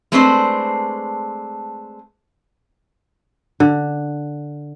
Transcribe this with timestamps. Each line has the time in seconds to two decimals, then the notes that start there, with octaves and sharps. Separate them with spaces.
0.12 G#3 A3 C4 D4 B4 C5
3.60 D3